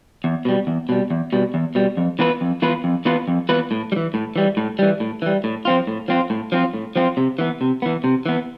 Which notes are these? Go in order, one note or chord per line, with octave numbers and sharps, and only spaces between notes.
E2
B2 G3
E2
B2 G3
E2
B2 G3
E2
B2 G3
F2
E3 B3 F4 B4
F2
E3 B3 F4 B4
F2
E3 B3 F4 B4
F2
E3 B3 F4 B4
A2
G3
E3
A2
E3 G3
A2
E3 G3
A2
E3 G3
A2
F3 C4 F4
A2
F3 C4 F4
A2
F3 C4 F4
A2
F3 C4 F4
C3
E3 B3
C3
E3 B3
C3
E3 B3